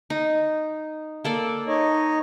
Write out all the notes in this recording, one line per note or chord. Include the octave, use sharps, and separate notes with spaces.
D#4
A#3 A4 D5
D#4 C#5 D#5